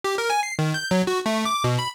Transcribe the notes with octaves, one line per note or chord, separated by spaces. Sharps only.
G4
A#4
G#5
C7
D#3
G6
F#3
F#4
A3
D6
B2
B5